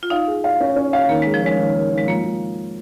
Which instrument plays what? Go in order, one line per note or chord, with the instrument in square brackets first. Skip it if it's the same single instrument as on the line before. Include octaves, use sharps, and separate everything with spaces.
[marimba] F4
[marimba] D#4 [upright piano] F5
[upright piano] G#4
F5
C#4
C#4
F5
[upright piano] D#3 [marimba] A#3
[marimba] G#3 [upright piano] G#4
[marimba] F3
[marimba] G#3 [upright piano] C#4
[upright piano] D#3
D#3
D#3
[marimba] G#3
[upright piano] F3 [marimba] A#3
[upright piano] F3